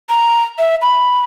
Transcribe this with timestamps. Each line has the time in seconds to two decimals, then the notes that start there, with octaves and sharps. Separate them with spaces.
0.09 A#5
0.59 E5
0.82 B5